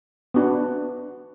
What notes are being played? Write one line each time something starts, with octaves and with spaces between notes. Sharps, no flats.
B3 D4 F#4